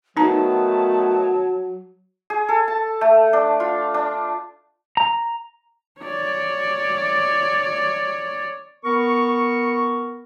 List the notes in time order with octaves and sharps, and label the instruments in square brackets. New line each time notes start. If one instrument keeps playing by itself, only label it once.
[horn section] D#3 A3 B3 [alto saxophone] F#3 [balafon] D#4 A#5 [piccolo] A5
[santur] G#4
A4
A5
A3
D4
F4
D4
[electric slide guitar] A#5
[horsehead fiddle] C#5 D5
[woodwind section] B3 A#4 C#6